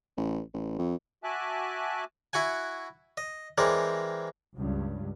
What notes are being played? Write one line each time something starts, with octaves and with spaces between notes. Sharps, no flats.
A1
A1
F2
F#4 E5 G#5 A5 D6 F#6
E4 F#4 F#5 G#5
D#5
E3 G#3 C4 A#4 D5
C#2 G2